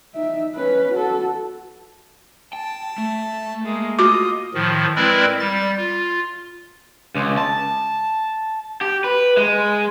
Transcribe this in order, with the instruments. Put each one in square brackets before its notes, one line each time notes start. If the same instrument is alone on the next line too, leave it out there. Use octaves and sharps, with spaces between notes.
[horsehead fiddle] D#4 E5
C#4 B4
F#4 A4
[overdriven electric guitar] G5 [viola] A5
[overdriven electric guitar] A3
[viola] G#3 A#3
[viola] F4 D#5 [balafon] F#4 D6
[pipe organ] A2 D#3 F3
G#3 C4 E4 A#4 B4 D5
G3 A6
F4
[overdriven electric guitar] C#2
A5
G4
B4
G#3